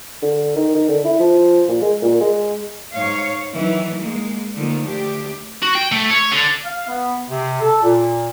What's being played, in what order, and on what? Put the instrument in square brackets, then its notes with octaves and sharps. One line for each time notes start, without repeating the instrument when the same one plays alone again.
[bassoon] D3
D#3
D#3
D3
E4
F3
A#2
G#3
A#2
G#3
[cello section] G#2 C#5 F5
D#3 E3 F#3
G#3 A#3
D3 D#3 F3 A3 A#3
D2 D4 G4
[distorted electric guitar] F#4
G5
A3
C#5
D3
[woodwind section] F5
B3
C3
A4
A#2